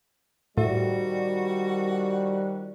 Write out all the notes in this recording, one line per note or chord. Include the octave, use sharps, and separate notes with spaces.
A2 D#3 F3 G3 F#4